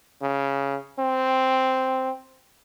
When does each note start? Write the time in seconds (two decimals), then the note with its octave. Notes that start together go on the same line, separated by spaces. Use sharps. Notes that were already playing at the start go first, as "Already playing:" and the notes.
0.22 C#3
0.99 C4